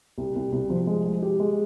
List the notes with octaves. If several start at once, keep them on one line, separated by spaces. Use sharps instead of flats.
C2
C2
C2
F3
G#3
G#3
G4
G#3